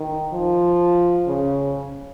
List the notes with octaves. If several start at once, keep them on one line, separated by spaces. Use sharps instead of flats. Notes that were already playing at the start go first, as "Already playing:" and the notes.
Already playing: D#3
F3
C#3